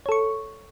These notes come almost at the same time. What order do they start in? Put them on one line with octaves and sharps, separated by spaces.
C#5 A4 C#6